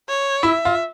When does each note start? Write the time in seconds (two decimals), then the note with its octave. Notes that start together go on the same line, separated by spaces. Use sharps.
0.09 C#5
0.43 E4 E5
0.65 F4